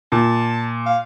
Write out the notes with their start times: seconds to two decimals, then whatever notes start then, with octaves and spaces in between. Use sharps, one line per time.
0.12 A#2 A5
0.86 F5